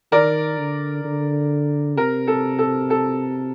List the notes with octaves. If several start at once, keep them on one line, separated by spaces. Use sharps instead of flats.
D#3 A#4 D5
D3
D3
C3 A#4
A4
A4
A4